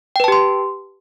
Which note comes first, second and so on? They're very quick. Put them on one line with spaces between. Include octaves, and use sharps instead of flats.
G5 B4 A5 G4 C6